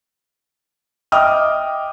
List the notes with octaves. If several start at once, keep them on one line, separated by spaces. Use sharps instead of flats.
D#5 E5 G5 D6 D#6 F6